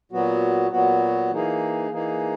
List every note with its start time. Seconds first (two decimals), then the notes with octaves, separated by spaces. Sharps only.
0.12 A#2 F#3 B3 F#4
0.71 A#2 F#3 B3 F#4
1.32 E3 A#3 D#4 G#4
1.91 E3 A#3 D#4 G#4